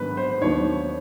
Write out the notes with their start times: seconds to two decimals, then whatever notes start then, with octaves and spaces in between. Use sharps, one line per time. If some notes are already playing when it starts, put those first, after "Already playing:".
Already playing: A#1 G#2 D#3 F#3 B3 B4
0.17 C5
0.41 D#2 D#3 F#3 B3 D4 C#5